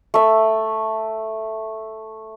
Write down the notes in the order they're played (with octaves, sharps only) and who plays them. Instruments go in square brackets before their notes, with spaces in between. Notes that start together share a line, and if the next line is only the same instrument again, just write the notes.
[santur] A3 E5